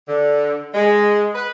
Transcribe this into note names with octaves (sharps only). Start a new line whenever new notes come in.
D3
G#3
B4